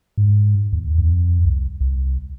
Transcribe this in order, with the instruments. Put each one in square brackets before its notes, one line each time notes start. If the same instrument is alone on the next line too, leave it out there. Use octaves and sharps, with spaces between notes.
[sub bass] G#2
D#2
F2
C2
C2